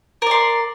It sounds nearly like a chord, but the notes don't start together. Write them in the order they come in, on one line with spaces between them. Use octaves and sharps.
A#4 D5 C6